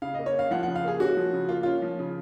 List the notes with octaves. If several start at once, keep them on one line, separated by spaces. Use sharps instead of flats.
C#3 F5
A#3 D#5
C#5
C#4 F5
F3 F#5
C#3 F#5
F5
A#3 G#4
C#4 F#4
F3
C#3
A#3 F4
C#4 F4
F3
C#3